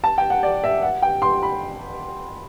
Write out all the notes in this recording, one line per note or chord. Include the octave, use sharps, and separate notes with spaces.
A5
G5
F#5
D5
E5
F#5
G5
C6
B5